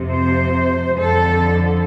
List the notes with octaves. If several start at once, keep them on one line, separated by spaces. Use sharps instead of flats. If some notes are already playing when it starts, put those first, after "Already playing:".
Already playing: F2 C3 F3
C5
F2 D3 F3 A4